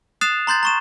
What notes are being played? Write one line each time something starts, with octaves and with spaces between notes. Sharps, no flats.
D#6 F#6 A6 C7 E7 F7
A#5 C6 G6 A6
A#5 C#6 E7